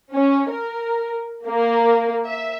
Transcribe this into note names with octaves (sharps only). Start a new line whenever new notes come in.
C#4
A#4
A#3
E5